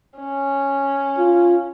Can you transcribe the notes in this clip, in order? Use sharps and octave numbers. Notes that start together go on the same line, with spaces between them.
C#4
F4